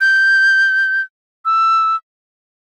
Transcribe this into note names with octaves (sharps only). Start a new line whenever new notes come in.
G6
E6